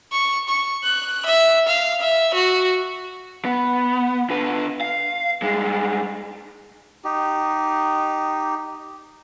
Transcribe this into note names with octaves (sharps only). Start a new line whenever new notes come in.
C#6
C#6
F#6
E5
F5
E5
F#4
B3
D3 B4
F5
G2 G#3
D#4 G4